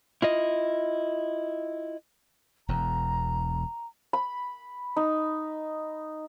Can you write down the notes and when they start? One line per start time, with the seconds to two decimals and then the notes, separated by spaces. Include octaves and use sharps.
0.22 E4 F4 D#5
2.69 E1 E2 A#5
4.13 B5
4.96 D#4